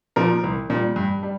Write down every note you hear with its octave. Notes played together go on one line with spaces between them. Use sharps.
A#2 F3 A#4
C2
A#2 G3
G2
G3